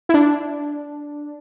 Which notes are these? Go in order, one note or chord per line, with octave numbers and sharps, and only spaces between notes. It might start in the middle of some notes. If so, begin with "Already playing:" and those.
E4
D4